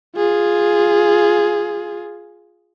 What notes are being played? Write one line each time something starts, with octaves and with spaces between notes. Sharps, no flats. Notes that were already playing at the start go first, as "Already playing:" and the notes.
F4 G#4